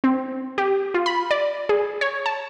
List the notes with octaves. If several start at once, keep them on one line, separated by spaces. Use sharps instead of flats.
C4
G4
F4
B5
D5
G#4
C#5
A5